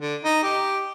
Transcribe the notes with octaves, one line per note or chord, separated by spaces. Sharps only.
D3
D#4
G4